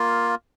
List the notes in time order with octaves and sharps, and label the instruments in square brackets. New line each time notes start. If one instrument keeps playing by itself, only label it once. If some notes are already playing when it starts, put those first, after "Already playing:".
Already playing: [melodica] A#3 F4